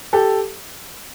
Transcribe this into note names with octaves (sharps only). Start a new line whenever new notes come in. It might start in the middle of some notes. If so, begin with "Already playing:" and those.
G4 A4